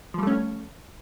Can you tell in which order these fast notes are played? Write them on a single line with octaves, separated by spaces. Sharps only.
F3 G3 A3 C#4